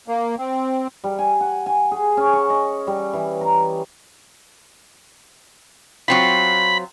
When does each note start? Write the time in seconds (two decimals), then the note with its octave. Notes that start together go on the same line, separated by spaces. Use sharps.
0.08 A#3
0.39 C4
1.04 G3
1.19 G#5
1.41 F#5
1.66 G#5
1.91 G#4
2.17 C#4
2.33 C#6
2.50 D#5
2.87 G3
3.13 E3
3.41 A#5
6.08 F#3 C4 F4 B5